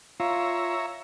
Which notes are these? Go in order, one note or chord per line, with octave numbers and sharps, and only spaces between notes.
F4 C#5 E5 A#5